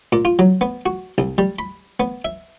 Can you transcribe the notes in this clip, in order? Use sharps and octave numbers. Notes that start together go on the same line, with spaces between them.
A#2
F4
F#3
B3
F#4
C2
G3
B5
B3
E5